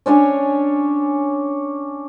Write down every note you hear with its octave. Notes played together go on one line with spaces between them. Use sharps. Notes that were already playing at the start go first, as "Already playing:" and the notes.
C#4 D4 C#5 G#5